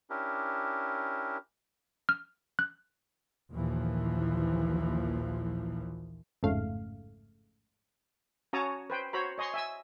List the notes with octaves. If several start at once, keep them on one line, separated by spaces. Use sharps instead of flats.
C#4 D4 E4 G4 A#4
F6
F#6
A#1 D#2 A#2 E3 F3
A1 F2 G#2 C#3 A3 F5
C#4 F#4 C#5 A5 A#5 D#6
B4 C5 G5
F#4 C5 C#5 A#5 B5
C#5 D#5 G#5 C6 C#6
E5 G#5 E6